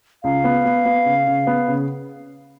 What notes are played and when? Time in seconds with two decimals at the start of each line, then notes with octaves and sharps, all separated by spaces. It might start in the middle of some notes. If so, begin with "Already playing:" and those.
0.23 C#2 F5
0.44 B3
0.65 B3
0.85 B3
1.05 C#3
1.27 C#3
1.47 B3
1.68 C#3